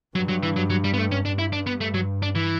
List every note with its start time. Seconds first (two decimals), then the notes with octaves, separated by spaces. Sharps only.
0.15 G2 F#3
0.29 F#3
0.43 E3
0.56 F#3
0.70 F#3
0.84 G3
0.94 B3
0.98 A3
1.12 C#4
1.25 G2 D4
1.39 E4
1.53 D4
1.67 B3
1.81 A3
1.94 F#3
2.22 D4
2.35 E3